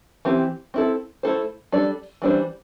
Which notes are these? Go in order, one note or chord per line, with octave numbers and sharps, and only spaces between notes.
E3 C4 G4
C4 E4 A4
A3 E4 A4 C5
G3 D4 A4 D5
E3 G3 D4 C5